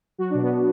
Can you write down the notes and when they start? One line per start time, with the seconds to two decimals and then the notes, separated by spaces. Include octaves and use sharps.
0.18 F#3 F#4
0.30 B2 D4
0.42 B3
0.50 B2